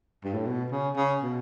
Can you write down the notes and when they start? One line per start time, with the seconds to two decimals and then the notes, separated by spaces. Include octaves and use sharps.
0.24 G2
0.34 A2
0.46 B2
0.71 C#3
0.96 C#3
1.23 B2